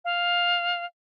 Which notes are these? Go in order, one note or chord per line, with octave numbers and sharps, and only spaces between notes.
F5